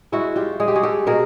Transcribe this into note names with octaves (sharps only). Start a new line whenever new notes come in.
G#3 E4 F#4
F4 G4
G#3 G#4
G4
F#4 G#4
G4 A4
B2 G#4 A#4